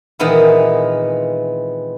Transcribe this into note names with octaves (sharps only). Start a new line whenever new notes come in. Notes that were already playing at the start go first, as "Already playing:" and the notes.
A#2 D#3 E3 G#3 B3 C4